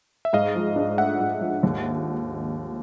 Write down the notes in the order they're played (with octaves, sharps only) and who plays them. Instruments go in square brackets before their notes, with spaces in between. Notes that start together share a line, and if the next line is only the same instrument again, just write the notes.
[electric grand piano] E5
[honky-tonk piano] G#2 [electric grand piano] D#5 F5
[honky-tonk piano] F3
D4
[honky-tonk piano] A3 [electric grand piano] E5 F#5
[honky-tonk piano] G#2
F3
D#2